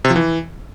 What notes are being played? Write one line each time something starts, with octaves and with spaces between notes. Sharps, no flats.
C3
F3
E3